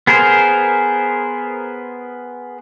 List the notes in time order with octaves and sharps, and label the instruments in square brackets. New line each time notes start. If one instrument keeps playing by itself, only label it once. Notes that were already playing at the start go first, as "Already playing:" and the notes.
[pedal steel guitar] B3 G#4 A#4 C5